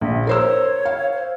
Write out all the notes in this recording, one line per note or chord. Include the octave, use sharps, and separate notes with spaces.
A#1 E5
A#4 C5 C#5 E6
F5
C5